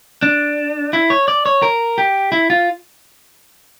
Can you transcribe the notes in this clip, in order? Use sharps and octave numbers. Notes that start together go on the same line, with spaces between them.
D4
E4
C#5
D5
C#5
A#4
G4
E4
F4